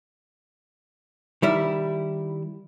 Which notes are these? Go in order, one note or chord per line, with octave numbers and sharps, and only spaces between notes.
D#3 G3 E4